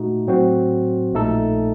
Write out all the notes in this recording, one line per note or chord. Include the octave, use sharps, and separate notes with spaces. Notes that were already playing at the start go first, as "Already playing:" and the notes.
Already playing: A#2 A3 D#4 F#4
A2 F#3 C4 F#4 C5
A#1 A#2 A3 D#4 A4